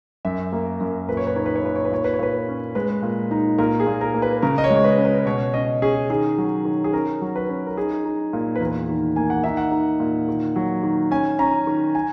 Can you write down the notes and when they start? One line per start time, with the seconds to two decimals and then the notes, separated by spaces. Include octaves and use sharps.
0.25 F#2 E5
0.53 A#3
0.80 F#2
1.08 A#2 B4
1.17 C#5
1.27 B4
1.36 D#4 C#5
1.46 B4
1.56 C#5
1.63 A#2 B4
1.76 C#5
1.85 B4
1.91 A#2 C#5
2.04 B4
2.14 C#5
2.19 A#2 B4
2.48 C#4
2.75 G#3 B4
3.03 A#2
3.31 D#4
3.58 A#2 A#4
3.80 G#4
3.87 A#2
4.01 A#4
4.14 A#3
4.22 B4
4.42 C#3 A#4
4.58 D#5
4.64 C#5
4.70 G#3
4.76 C#5
4.84 B4
4.98 C#4
5.05 B4
5.26 B2 C#5
5.54 C#4 D#5
5.82 C#4 G#4
6.10 D#3 G#4
6.38 F#3
6.65 D#3
6.84 G#4
6.93 C#4 A#4
7.21 F#3
7.36 B4
7.49 C#4
7.67 A#4
7.77 D#4 G#4
8.05 D#4
8.33 A#2
8.56 B4
8.60 E2 A#4
8.89 D#3
9.16 A#3 G#5
9.30 F#5
9.44 D#4 E5
9.57 F#5
9.72 D#4
10.00 A#2
10.28 D#3
10.56 F#3
10.83 D#3
11.11 C#4 G#5
11.39 C#4 A#5
11.67 D#3
11.95 G#5